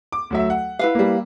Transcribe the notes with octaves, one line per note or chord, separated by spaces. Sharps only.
D6
D2 F#3 E5
F#5
E4 B4 F5
G3 A#3